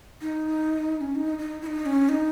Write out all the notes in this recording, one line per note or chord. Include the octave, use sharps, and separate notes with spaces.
D#4
C#4
D#4
D#4
E4
D#4
C#4
D#4